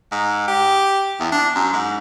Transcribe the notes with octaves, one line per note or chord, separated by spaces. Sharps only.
G#2
G4
E2
D4
F#2
G#2